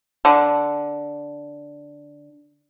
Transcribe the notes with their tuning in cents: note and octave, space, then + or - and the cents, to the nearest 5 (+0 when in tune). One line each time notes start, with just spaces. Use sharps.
D3 -5